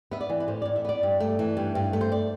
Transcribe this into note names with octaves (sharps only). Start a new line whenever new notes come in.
B3 E5
D5
E3
B4
A2 C5
D5
A2
E5
B3 D5
G2
A3
E3
G2
G2
A3
C5
D5